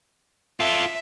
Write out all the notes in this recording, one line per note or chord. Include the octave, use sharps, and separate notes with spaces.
F4 A4 E5